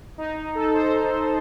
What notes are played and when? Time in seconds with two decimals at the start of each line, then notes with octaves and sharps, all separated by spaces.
0.18 D#4
0.55 A4
0.74 C5